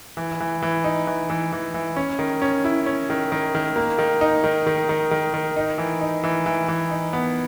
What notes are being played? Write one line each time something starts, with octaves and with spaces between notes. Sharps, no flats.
E3
E3
E3
D#4
E3
E3
E3
E3
C#4
D#3
C#4
E4
C#4
D#3
D#3
D#3
A#3
D#3
D#4
D#3
D#3
D#3
D#3
D#3
D#4
E3
D#4
E3
E3
E3
D#4
B3